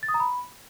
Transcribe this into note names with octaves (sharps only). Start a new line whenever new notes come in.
A6
D#6
A#5
B5